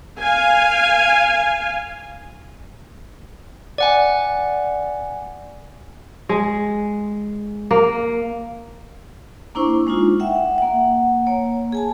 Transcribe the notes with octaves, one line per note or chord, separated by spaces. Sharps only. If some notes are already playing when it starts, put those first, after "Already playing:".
F5 G#5
D5 F#5 G#5
G#3
A#3
A#3 D4 E4 C5 C#6
G#3 D4 D#4 F4
E5 F#5 G5
A#3 F#5
A#3 C#5
G#4 G#5 A5